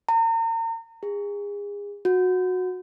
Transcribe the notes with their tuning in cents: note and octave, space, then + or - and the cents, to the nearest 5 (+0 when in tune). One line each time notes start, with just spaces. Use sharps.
A#5 -40
G#4 -30
F#4 -15